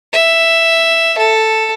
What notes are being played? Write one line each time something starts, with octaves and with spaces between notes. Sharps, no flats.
E5
A4